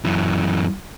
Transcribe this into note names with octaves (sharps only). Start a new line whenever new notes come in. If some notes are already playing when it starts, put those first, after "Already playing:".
F#2 E3